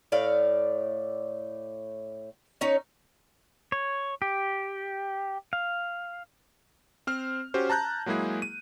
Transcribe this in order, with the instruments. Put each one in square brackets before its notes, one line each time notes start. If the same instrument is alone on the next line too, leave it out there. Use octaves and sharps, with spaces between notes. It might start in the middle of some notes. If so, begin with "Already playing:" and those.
[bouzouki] A2 D5 F5
C#4 D#4 C#5
[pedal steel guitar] C#5
G4
F5
[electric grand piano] C4 C5 F6
C#4 F#4 G4 C5
A5 A#5 F#6 G6
F#3 G#3 A#3 E4 G#4
D#7